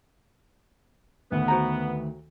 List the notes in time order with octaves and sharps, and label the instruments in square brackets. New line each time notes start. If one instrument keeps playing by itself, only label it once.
[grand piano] D2 D#3 [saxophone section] B3
[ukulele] F#4 C5 A#5